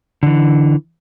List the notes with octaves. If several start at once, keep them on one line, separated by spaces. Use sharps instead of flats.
D3 E3